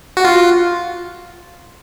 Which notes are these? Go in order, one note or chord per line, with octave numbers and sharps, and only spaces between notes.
F#4
F4